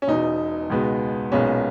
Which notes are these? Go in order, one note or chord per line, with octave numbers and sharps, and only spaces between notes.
C#4
E1 E2 B2 D#4
C#2 B2 G#3 B3
B1 A#2 G#3 B3 C#4